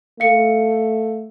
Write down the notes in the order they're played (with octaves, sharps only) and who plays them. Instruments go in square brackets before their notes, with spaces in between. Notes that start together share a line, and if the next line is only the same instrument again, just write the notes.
[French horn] A3 [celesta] F5 C#7